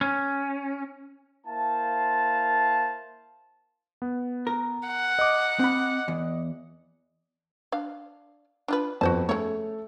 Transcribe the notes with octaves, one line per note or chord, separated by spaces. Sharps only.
C#4
A#3 E4 C5 F5 A5
B3
A#4
F#5
D#5 D6
C4 B5
E2
D4 F5
D4 F4 B4
F2 B3 F#4 C5 A5
C#3 A3 C#5